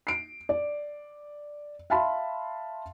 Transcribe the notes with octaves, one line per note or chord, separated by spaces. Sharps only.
C7 D7
D5
E5 F5 A5 B5 C6